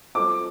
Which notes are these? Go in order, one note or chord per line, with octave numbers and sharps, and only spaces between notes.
G3 C4 F4 A4 C5 D6